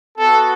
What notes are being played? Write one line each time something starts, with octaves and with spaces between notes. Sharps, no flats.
B3 F#4 A4